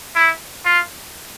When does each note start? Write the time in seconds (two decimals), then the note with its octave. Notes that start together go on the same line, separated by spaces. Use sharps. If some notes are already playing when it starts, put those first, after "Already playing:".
0.15 E4
0.65 F4